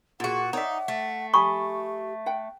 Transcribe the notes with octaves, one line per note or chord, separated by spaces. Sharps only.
A#2 F4 F#4 G#4 F#5
D#4 C#5 D5 E5
A3
G4 G#5 B5 C#6 D#6
F#5 G5